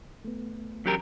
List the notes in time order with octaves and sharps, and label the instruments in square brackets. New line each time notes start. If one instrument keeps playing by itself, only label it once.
[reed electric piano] A3 B3
[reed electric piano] E3 C#4 [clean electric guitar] F#3 G4 A#4